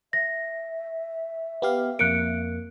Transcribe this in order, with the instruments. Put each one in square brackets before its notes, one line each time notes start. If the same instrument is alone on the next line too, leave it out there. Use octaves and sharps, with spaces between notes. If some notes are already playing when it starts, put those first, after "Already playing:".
[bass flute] E5 [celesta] A#6
[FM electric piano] B3 G4 F5
[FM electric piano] F2 A#3 [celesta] F#6 C#7 D7